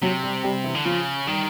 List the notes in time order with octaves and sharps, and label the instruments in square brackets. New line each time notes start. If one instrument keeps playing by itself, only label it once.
[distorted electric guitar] C3 [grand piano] F#3 F#4
[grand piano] G3 G4
G3 G4
E3 E4
[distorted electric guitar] D3
[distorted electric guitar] C#3 [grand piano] F3 F4
[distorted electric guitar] D#3 [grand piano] G3 G4